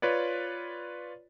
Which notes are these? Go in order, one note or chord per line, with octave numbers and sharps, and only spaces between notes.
F4 B4 C#5 D5